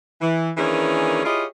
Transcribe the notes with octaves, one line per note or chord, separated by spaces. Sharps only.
E3
D#3 E3 A#3 C#4 D4 G#4
E4 F4 G4 G#4 C#5 D#5